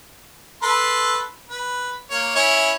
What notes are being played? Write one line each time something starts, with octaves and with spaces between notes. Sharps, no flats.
A4 B4 C6
B4
A#3 C#5
C#4 E4 C#5